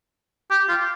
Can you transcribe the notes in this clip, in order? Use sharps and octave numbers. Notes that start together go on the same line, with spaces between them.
G4
F4